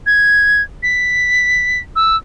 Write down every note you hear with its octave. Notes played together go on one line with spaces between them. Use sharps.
G#6
B6
E6